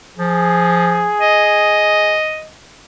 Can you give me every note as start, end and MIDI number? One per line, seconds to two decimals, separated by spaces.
0.18 1.09 53
0.18 2.18 68
1.21 2.47 75